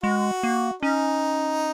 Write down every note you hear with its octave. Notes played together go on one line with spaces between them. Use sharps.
G#3 F#4
A#3
C#4 D#4